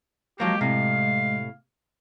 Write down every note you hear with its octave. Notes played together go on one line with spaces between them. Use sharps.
F3 F#3 G#3 A#3 G4
A2 C3 F5